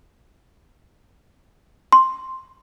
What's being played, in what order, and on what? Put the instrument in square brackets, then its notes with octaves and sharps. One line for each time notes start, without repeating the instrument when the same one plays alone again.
[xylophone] C6